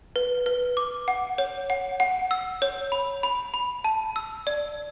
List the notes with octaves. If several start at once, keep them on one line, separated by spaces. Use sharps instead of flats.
B4
B4
D6
F#5
C#5
F#5
F#5
E6
C#5
B5
B5
B5
A5
E6
D5